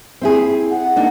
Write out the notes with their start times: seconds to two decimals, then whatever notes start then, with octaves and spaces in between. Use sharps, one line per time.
0.21 C4 E4 G#4
0.71 F#5
0.96 A#3 D4 D#4